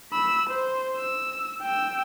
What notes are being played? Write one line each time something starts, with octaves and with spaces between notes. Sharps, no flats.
B5 E6
C5
E6
G5 E6